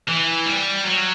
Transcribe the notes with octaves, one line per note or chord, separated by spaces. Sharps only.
E3
G3
F#3